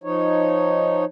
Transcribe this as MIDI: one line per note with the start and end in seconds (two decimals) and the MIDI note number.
0.04 1.05 53
0.04 1.05 63
0.04 1.05 73